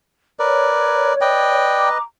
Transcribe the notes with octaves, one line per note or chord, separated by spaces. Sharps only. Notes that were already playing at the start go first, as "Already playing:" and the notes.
A#4 B4 C#5 D5
B4 D5 D#5 G5
A#5 D6